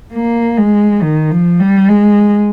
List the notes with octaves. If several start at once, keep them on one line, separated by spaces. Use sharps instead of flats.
A#3
G#3
D#3
F3
G3
G#3